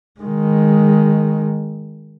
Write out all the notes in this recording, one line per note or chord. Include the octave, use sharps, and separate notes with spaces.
D#3 G#3